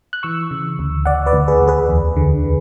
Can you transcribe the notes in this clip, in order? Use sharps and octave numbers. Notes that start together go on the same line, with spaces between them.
F#6
E3 C#6 E6
C#3
D2
D2 D5 F#5
B4 D5
D2
G#4 B4
D2
G#4 B4
E2
D3
D3